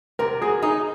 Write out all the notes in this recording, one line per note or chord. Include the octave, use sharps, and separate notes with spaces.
C3 A#4
F#3 G#4
D#4 G#4